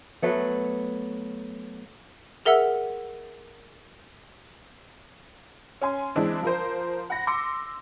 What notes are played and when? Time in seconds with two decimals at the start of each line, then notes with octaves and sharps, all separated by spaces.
0.22 F#3 A3 B3
2.45 G#4 A#4 E5 F#5 E6
5.81 C#4 G#5 C6
6.16 E3 G#3 C4 D4 E4
6.42 F3 A#4 C5
7.10 F#5 B5 A#6
7.27 C6 D6 E6 A#6 C#7